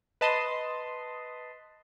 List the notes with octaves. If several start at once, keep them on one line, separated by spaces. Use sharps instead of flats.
B4 D#5 A5 B5 C6 D#6